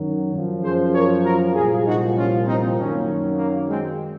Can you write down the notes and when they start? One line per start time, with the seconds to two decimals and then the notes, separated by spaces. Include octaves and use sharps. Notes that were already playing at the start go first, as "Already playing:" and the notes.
Already playing: F#2 D#3 F#3
0.34 F#2 F3
0.64 G#4 C5
0.94 A#4 C#5
1.24 F#4 A#4
1.55 C2 A#2 F3 F4 G#4
1.86 D#4 F#4
2.16 C#4 F4
2.47 C4 D#4
2.77 F#2 D#3 F#3 A#3 C#4
3.38 A#3
3.69 G#3 C4